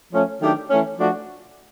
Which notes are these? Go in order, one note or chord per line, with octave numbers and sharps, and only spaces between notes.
F3 A3 C#4
D#3 F#3 A3 D4 G4
E3 A3 C#4
F3 A3 D4 F#4